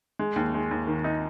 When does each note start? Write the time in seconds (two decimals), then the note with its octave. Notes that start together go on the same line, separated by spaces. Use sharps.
0.19 G#3
0.36 D#2
0.54 G#3
0.71 D#2
0.87 D#3
1.04 D#4